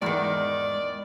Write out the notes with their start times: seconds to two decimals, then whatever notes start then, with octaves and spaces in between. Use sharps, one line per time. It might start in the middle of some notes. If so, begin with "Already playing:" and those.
0.02 E2 G#2 D#3 D5